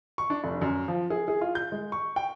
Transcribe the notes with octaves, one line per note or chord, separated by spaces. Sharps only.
C#6
D4
F1
F#2
F3
G#4
G#4
F4
G6
G#3
C#6
G5